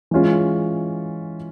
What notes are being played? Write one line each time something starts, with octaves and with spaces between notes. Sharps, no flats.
E3 G#3 C#4 F4